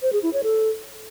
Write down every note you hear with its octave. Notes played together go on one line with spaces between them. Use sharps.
C5
G#4
E4
C#5
A4